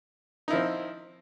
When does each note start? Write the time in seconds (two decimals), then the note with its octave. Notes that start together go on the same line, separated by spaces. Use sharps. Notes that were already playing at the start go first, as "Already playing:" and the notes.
0.48 D#4
0.50 E4
0.53 F3
0.56 C4